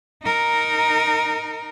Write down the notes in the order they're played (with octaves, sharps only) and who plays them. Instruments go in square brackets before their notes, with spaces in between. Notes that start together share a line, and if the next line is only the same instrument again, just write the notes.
[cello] D#4 A#4